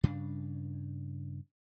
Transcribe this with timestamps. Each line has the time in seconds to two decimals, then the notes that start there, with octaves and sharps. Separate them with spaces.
0.03 G2 C#3 D4